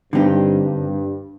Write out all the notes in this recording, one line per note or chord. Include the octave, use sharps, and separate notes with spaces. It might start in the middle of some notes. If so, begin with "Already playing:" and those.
G2 D3 G3 C4 D#4 G4
G2